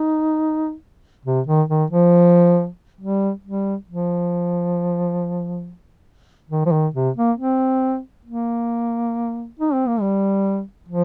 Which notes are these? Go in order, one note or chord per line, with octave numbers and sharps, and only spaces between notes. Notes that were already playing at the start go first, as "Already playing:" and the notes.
Already playing: D#4
C3
D#3
D#3
F3
G3
G3
F3
D#3
F3
D#3
C3
A#3
C4
A#3
D#4
C4
A#3
G3
F3